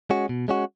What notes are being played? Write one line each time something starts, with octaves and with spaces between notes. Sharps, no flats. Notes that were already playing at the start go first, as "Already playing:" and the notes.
G#3 C#4 F#4
B2
G#3 C#4 F#4